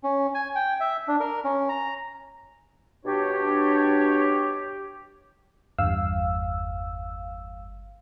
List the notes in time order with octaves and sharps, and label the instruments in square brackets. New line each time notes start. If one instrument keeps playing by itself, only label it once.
[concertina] C#4
G#5
G5
E5
D4
A#4
C#4
A#5
[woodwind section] B2 D4 C#5 [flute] G4
[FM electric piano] G1 E2 G2 F5 E6